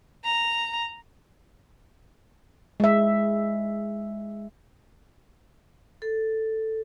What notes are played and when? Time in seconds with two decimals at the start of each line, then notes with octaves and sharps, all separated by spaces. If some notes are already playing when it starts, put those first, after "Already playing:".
0.25 A#5
2.80 G#3 E5
6.02 A4